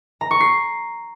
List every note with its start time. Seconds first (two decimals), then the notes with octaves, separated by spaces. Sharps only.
0.21 A#5
0.31 C#6
0.40 C7